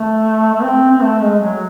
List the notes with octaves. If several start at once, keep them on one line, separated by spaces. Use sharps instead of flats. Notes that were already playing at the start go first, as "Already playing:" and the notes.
Already playing: A3
A3
C4
C4
A3
G#3
F#3